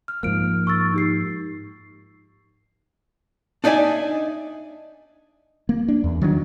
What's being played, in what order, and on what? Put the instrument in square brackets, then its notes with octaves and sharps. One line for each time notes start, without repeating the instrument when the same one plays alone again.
[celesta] F6
[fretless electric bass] G#2 F3 A#3 [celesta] F6 D7
[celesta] C#6 E6 A6
D#4 G4 C7
[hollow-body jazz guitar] D4 D#4 D5 E5 G#5
[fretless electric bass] A#3
D4
E2
D#3 F#3 G3 D4